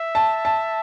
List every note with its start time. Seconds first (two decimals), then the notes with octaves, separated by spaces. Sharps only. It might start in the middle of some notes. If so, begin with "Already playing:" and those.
Already playing: E5
0.15 A5
0.45 A5